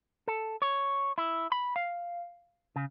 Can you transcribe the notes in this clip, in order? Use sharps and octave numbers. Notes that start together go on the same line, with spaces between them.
A4
C#5
E4
B5
F5
C#3